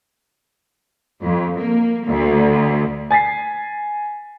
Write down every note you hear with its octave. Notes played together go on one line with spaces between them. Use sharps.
F2
A#3
D2
G#5 A6 B6 C7